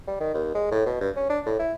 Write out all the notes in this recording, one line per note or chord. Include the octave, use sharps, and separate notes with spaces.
G3
D#3
D#2
G#3
A2
B2
G2
C#4
D4
A2
E4